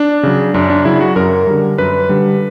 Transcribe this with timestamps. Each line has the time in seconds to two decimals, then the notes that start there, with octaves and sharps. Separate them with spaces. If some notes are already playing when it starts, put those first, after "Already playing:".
Already playing: D4
0.23 C#3 F#3
0.54 F#2 D4
0.70 D4
0.85 C#3 F#3 E4
1.01 F#4
1.16 F#2 A#4
1.47 D3 G3
1.78 F#2 B4
2.09 D3 G3